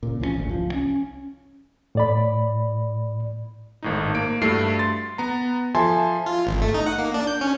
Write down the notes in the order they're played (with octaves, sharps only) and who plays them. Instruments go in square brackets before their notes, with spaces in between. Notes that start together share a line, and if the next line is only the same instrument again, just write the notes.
[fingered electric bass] A#2 C#3
C2 F3 G#3 C#4
G#1 D2
C2 F3
C#4
[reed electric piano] A2 D5 B5
[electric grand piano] G#1 A2 D#4
A#3 D7
G2 A3 E4 F#4 C7
C6 A6
B3 A#5
F3 A4 E5 G#5 A5 C6
[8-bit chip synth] F4
G#1
A3
D#4
F#5
A#3
D4
G6
C#4